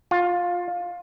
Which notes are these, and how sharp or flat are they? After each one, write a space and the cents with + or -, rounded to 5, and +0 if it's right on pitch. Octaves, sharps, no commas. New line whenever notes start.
F4 +15